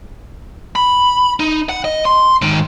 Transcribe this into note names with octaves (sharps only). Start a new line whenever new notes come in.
B5
D#4
F#5
D#5
C6
G#2 D#3